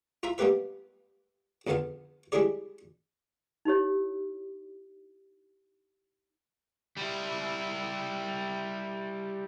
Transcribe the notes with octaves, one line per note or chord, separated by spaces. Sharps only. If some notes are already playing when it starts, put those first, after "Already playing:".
F4 E5 A#5 B5
G3 A#3 B3 G4 B4 E5
A#1 F2 D3 B3 F5 A5
G3 G#3 D4 E4 G#4 D5
D#4 E4 G4 C#5
G3 E4